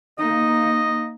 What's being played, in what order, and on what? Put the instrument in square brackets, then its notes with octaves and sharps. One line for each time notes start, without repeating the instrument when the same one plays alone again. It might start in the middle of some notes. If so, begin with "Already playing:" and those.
[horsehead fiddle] A#3 D#4 [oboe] D#5